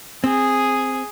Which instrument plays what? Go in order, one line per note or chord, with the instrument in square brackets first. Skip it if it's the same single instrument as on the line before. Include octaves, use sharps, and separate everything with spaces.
[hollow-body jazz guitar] C4 [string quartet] G#4